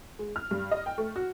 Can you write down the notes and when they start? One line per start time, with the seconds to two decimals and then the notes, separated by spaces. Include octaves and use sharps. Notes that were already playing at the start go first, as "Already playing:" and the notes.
0.19 G#3
0.36 F6
0.51 G2
0.71 D#5
0.86 G5
0.98 A3
1.16 F#4